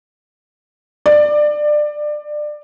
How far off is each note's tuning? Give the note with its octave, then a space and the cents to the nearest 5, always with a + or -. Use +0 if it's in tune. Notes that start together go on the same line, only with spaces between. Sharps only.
D5 +20